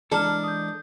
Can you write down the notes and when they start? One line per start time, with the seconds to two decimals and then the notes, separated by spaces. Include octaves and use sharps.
0.12 E3 G#3 D4 A4 A#5 F6
0.43 D#6 G6